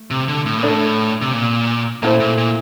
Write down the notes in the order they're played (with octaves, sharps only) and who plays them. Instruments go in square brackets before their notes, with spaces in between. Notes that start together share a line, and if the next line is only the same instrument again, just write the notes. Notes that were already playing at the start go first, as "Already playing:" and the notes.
Already playing: [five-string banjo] A3
[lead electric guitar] C3
D3
A2
A#2
[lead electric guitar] A2 [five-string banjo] D4 A4 D5
[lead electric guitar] C3
A#2
[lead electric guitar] A#2 [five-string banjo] A3 E4 A4 C5
[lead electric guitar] A#2
A#2